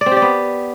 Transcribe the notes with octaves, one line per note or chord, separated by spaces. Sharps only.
D5
C4
G4
D5
B3